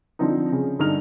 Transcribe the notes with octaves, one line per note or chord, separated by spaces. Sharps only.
D3 F3 C4 D#4
C#3
G2 D3 D#4 F6 F7